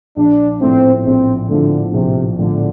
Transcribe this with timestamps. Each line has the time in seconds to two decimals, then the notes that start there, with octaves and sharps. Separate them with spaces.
0.17 A#1 D4
0.61 A2 F3 A3 C4 E4
1.05 A#1 C4
1.49 A2 D3 F3 A3 E4
1.93 A#1 C3
2.38 A2 D3 F3 A3 E4